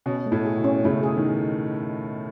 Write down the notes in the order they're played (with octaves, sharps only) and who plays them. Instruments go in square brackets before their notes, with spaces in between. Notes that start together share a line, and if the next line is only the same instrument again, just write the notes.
[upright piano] B2 [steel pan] C#4
[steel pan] A3
[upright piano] A2
[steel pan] G#4
[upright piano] B2
[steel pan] C#4
[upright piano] A2 C#3 [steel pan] A3
[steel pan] G#4
[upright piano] D#3